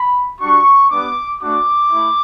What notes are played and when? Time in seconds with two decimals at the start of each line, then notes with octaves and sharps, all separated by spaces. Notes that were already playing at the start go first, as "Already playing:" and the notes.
Already playing: B5
0.40 G3 D4 F#4 C#6
0.91 G3 B3 D4 D6
1.41 A3 D4 F#4 D6
1.92 A3 E4